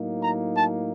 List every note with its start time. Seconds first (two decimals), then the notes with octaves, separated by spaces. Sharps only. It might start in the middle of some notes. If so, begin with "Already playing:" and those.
Already playing: A2 F#3 A#3 D#4
0.22 A#5
0.55 A5